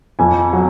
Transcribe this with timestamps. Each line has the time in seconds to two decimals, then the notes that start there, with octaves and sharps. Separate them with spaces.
0.19 F2 G#5
0.53 F#3